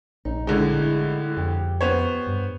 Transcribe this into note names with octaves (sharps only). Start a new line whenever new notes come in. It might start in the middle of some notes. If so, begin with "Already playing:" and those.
A#1 D#4
A2 D3 G#3 D#4
E4
F2 G4
B3 C5 C#5
G2